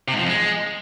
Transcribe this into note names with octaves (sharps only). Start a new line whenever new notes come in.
C3
G#2
F3
F2
G#3